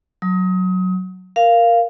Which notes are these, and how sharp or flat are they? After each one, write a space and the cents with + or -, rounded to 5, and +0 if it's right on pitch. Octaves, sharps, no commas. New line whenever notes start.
F#3 +0 D#6 +30
A#4 +0 F5 -10